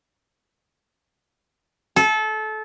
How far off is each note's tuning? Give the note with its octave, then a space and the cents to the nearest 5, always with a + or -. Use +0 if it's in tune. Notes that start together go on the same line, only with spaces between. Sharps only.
A4 -25